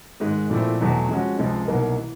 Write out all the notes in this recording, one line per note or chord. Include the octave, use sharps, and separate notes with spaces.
G#2 D#3 G#3
A#2 F3 A3 C4 E4
E2 B2 F#3 A3
F3 G#3 C#4 F#4
C#2 C3 F3 G#3
C2 B2 F#3 A#3 D#4
E3